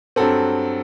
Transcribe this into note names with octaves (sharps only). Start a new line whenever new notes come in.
G2 F#3 C4 A4